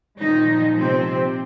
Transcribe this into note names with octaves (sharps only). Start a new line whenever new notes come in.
A#2 D#3 F3 D#4
C3 C4